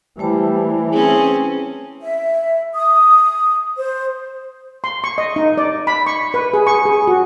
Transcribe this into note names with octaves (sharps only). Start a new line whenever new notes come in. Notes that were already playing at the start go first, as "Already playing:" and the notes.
E3 G3 A3 C5 A5
C4 C#4 G#4
E5
D#6
C5
C6
C#6
D#5
D#4
D5
B5
C#6
B4
G#4
C#6
G#4
F#4